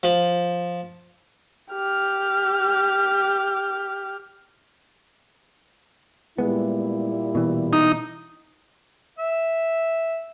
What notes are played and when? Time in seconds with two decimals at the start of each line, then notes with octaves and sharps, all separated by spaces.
0.03 F3
1.73 G4 F6
6.38 A#2 G3 G#3 B3 E4
7.35 B2 E3
7.73 D#4
9.19 E5